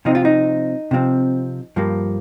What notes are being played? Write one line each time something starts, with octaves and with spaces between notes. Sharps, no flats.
C3 F3 C4 D#4
F4
D#4
C3 F3 C4
G2 F3 A#3